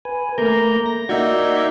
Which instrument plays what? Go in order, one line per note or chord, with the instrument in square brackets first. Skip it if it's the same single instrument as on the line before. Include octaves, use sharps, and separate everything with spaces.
[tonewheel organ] B4 G#5
[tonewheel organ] A3 A#5 G6 [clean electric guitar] A#3 A#4
[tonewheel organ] A#6
[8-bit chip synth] A#3 D#4 E5 [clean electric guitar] F#4 [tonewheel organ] D5 G6 G#6